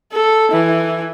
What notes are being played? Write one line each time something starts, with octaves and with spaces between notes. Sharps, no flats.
A4
E3